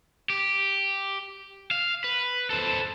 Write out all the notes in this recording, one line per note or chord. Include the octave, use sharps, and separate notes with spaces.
G4
F5
B4
A4 C5